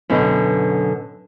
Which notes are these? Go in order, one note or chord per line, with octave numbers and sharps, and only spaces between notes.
F#2 B2 D3